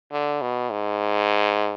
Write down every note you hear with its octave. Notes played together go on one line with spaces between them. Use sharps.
D3
B2
G#2